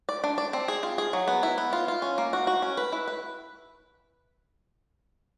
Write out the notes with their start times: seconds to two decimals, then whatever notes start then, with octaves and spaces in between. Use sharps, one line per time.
0.09 D5
0.24 D4
0.38 D5
0.53 C4
0.68 G#4
0.83 F4
0.98 G#4
1.13 F#3
1.28 B3
1.43 E4
1.58 B3
1.73 F4
1.88 F4
2.02 C#4
2.18 A#3
2.33 F#4
2.47 F#4
2.62 C#4
2.77 B4
2.92 E4
3.08 B4